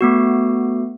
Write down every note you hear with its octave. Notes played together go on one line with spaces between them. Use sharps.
A3 B3 F#4